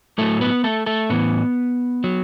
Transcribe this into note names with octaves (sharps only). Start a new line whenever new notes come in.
A2 F#3 A3 A4
B3 B4
A3 A4
A3 A4
A2 E3 B3
F#3